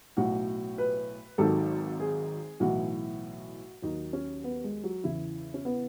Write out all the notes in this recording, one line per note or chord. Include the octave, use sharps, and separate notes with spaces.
B1 A2 F#3 F#4
B4
G#1 G#2 D#3 F#3 A4
G#4
B1 A2 E3 F#4
D#2 D#3 F#3 D#4
C#4
B3
G#3
F#3
E2 C#3 E3 E4
C#4
B3